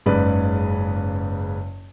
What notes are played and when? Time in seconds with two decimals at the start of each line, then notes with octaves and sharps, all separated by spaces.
0.06 F#1 G#2 C#3 B4 D5